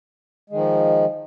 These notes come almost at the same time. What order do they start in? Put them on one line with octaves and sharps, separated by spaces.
G#3 D#3 F3